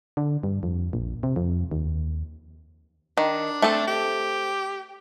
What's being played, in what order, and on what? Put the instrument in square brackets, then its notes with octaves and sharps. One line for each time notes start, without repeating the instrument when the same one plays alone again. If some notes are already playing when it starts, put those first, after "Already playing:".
[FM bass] D3
G2
F2
A#1
C3
F2
D#2
[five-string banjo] D#3 [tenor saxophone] D4
[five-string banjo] A3 C4 A4
[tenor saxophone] G4